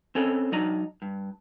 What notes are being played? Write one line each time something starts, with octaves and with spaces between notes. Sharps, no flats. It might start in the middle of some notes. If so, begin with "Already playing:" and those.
C4 C#4 A4
F#3 D4 D#4 D#5 A#5
G2